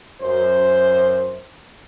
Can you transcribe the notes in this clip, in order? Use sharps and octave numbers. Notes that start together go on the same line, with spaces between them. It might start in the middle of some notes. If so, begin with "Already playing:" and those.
F#2 C5